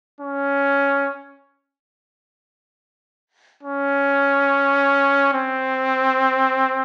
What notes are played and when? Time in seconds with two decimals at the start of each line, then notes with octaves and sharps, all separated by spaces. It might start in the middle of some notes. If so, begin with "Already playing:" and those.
0.20 C#4
3.63 C#4
5.34 C4